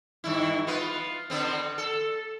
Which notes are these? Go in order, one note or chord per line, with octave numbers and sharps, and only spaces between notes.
G2 D#3 E4
B3 F4 B4
D3 B3 C4
A4